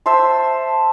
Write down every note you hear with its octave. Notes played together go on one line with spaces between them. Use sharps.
C5 E5 A5 C6